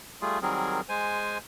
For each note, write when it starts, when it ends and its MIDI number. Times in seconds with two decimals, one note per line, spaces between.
0.22 0.39 55
0.22 0.39 57
0.22 0.39 65
0.22 0.39 68
0.42 0.81 51
0.42 0.81 54
0.42 0.81 55
0.42 0.81 60
0.42 0.81 68
0.42 0.81 70
0.89 1.38 56
0.89 1.38 72
0.89 1.38 80